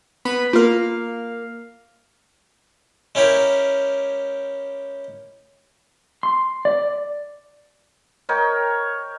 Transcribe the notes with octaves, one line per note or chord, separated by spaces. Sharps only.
B3 B4 B5
A#3 F4 A#4 F5
G#3 C#4 E4 G4 A#4
C6
D5
A#4 C#5 D#5 G5